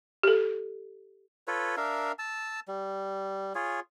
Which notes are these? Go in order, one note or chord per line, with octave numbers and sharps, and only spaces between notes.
G4 A4
F4 A4 B4 C#5
D4 A#4 E5 F5
A5 E6
G3
F4 G#4 C#5